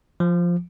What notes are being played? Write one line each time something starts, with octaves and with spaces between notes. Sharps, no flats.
F3